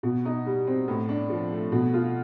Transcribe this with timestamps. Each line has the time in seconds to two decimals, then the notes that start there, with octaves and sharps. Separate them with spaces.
0.03 B2
0.25 D#4
0.46 G3
0.67 C4
0.88 A2
1.09 D4
1.30 F3
1.52 A3
1.72 B2
1.93 F4